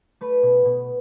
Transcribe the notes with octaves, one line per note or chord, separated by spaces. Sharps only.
A3 B4
B2
B2